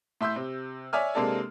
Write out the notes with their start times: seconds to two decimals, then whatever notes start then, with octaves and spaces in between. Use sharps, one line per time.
0.21 A2 E5 C6 E6 G6
0.36 C3
0.93 C#5 D5 E5 G#5 F6
1.15 C3 G#3 A#3 D4 A4